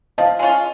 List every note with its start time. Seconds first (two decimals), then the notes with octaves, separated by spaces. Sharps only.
0.18 F3 D#5 F5
0.39 G#3 C#4 F4